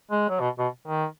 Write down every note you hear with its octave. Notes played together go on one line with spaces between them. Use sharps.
G#3
F#3
B2
B2
D#3